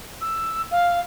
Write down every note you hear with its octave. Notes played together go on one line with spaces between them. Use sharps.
E6
F5